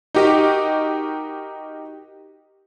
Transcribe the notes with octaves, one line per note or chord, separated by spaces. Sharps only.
D#4 F#4 G4 A#4 D#5